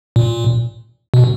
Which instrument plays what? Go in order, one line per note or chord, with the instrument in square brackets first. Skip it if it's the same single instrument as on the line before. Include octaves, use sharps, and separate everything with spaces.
[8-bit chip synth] A#2
B2